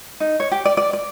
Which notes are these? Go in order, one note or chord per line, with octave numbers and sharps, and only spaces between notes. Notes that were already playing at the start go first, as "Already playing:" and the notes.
D#4
C#5
G4
D5
D5
D5